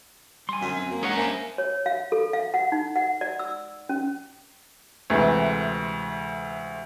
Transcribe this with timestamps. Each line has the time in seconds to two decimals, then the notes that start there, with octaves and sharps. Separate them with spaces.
0.49 G3 G#5 C6
0.61 F#2 D3
0.76 C4
0.91 A#3
1.03 G#3 C#4 G#4 A#4 C#5 F#5
1.18 G3 A#3 D4 C5 E5 G#5
1.58 C#5
1.86 F5
2.12 A4
2.33 F5
2.54 F#5
2.72 D#4
2.96 F#5
3.21 D5
3.39 E6
3.89 C#4
5.10 D2 C3 E3 G#3 A3